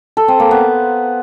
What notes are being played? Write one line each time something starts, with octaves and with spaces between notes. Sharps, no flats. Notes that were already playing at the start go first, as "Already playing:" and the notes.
A4
C4
A#3
B3